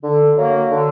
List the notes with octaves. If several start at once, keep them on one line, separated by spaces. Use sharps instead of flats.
D3
F#3 A#3
D3